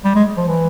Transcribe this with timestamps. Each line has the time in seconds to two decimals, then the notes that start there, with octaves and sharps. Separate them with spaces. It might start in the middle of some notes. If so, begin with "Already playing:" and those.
0.04 G3
0.15 G#3
0.37 F3
0.48 E3